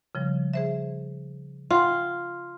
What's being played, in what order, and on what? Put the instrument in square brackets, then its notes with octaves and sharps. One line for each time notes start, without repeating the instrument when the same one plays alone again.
[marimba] C#3 F3 G3
G#4 C5 E5
[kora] F4 [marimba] F#5 G5